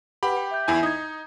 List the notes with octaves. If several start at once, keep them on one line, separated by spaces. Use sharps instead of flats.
G4 B4 F#5 B5
G5
E5 G6
E2 E4 G#5
D#4 D#6 G#6